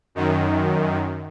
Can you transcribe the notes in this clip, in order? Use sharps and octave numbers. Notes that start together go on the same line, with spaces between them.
F#2 D#3